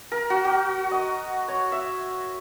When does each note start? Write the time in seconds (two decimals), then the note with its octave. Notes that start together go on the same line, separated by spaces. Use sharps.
0.12 A#4
0.30 F#4
0.45 F#4
0.91 D#5
1.48 C#5
1.72 E5